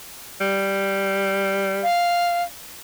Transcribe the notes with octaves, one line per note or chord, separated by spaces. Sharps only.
G3
F5